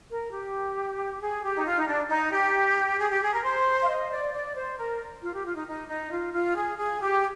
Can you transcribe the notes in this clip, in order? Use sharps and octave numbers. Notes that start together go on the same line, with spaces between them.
A#4
G4
G#4
G4
D#4
F4
D#4
D4
D#4
G4
G#4
G4
G#4
A#4
C5
F5
D#5
D5
D5
C5
A#4
F4
G4
F4
D#4
D#4
D#4
F4
F4
G#4
G#4
G4